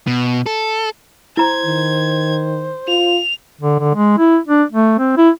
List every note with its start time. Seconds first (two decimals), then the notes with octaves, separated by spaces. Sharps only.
0.07 B2
0.46 A4
1.37 E4 C5 A#5 G#6
1.66 D#3
2.88 F4 F7
3.61 D3
3.80 D3
3.95 G#3
4.18 E4
4.48 D4
4.72 A3
4.99 C4
5.17 E4